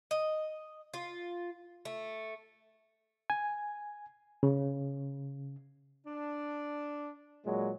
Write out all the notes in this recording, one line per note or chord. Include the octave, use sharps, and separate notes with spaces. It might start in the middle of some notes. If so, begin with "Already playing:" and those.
D#5
F4
A3
G#5
C#3
D4
A#2 F#3 G#3